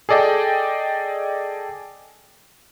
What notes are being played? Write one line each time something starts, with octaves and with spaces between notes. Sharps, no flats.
G#4 A4 D5 D#5 G5